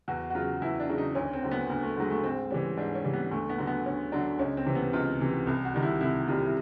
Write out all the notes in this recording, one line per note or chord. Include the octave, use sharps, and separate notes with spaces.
E2 F#4
F#4
C#3 F#3 F4
E2 E4
D4
C#3 F#3
D#4
D2 C#4
C4
D3 F#3
B3
D2 A#3
A3
D3 F#3 G#3
A3
G#2 C4
E3 G3 C#4
G#2 D4
C#4
E3 G3
B3
D2 A3
B3
D3 F#3
B3
D2 C#4
D3 F#3 D4
C#2 C#4
C4
C3 E3
B3
C#2 F4
C3 E3
C2
F#4
C3 D#3 G3
E4
C2 E4
C3 D#3 G3 F4
E4